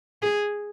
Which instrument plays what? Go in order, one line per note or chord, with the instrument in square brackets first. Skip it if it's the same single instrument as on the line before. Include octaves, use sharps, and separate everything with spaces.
[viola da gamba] G#4